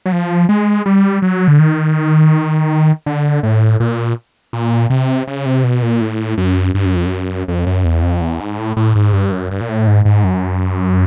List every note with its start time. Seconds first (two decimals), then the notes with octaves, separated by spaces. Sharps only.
0.06 F#3
0.12 F3
0.49 G#3
0.86 G3
1.22 F#3
1.48 D3
1.59 D#3
3.06 D3
3.43 A2
3.80 A#2
4.53 A#2
4.90 C3
5.28 C#3
5.46 C3
5.64 B2
5.82 A#2
6.01 A2
6.38 F#2
6.75 G2
6.85 F#2
6.95 F2
7.06 F#2
7.48 F2
7.67 F#2
7.85 E2
8.03 F2
8.21 E2
8.40 G#2
8.58 A2
8.77 A2
8.95 G#2
9.13 G2
9.32 F#2
9.51 G2
9.61 A#2
9.69 A2
9.87 G#2
10.05 G#2
10.24 F#2